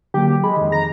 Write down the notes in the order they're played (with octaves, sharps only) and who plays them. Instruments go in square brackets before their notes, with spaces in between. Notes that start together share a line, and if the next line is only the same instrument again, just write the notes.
[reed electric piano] D3 F#3 A#3 [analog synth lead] G4
[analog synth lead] G#3 [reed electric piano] B5
[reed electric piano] F2 D#3
[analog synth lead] A#5